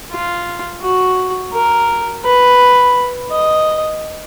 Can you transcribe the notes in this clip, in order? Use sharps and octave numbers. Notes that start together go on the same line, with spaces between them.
F4
F#4
A#4
B4
D#5